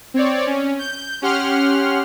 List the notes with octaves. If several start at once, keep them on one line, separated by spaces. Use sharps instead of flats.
C4 C#5 D5
C#4
G6
C#4 G4 F#5 C6 F6